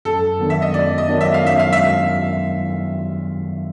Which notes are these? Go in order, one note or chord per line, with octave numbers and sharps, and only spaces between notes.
F#2 A4
D#3 F#3 B3 D4
E5
D#5
F#2 D5
D#5
D#3 F#3 B3 D4
E5
F5
F#2 E5
F5
E5